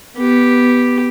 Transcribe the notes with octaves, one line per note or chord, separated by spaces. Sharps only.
B3 G4